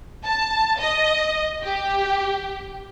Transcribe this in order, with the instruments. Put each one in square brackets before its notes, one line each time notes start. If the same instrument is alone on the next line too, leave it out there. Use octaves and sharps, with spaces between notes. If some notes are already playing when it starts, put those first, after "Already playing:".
[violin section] A5
D#5
G4